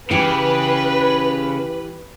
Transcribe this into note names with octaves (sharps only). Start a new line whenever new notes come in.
C#3 E3 G4 B4